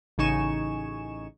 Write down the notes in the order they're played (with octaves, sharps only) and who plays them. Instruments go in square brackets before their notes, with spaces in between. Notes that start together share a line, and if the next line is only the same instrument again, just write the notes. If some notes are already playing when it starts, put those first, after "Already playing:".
[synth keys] A1 C#3 D#4 G#5 C#6 E7